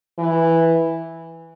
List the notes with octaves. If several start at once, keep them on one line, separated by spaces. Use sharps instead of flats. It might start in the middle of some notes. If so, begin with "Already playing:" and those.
E3